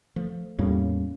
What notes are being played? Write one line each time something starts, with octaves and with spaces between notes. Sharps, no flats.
F3 A3
E2 A2 G3 A#3 C#4